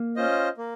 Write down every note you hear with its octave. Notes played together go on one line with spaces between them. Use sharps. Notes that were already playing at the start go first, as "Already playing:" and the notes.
Already playing: A#3
C#4 F4 C5 D#5
A#3